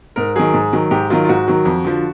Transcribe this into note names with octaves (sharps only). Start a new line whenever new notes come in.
G#2 A#4
D#3 F#3 G#4
G#2
D#3 F#3
G#2 G4
D#3 F#3 F4
F4
G#2 F#4
D#3 F#3
F2
D3 F3